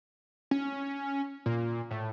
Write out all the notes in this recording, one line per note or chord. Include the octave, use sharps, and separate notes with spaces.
C#4
A#2
A2